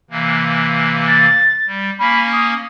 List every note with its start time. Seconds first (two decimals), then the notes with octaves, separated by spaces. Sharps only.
0.11 C3 E3 A#3
1.07 A6
1.67 G3
1.99 A#3 C#4 B5
2.33 D#6